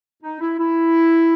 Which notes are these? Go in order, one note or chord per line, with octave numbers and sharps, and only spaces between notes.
D#4
E4
E4